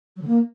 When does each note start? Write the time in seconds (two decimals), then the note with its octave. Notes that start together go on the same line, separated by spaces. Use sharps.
0.16 F#3
0.22 D3
0.27 A#3